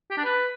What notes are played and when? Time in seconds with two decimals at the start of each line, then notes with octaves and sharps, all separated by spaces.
0.10 G4
0.17 D4
0.24 B4